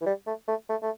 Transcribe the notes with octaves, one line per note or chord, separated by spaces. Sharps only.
E3
G3
A3
A3
A3
A3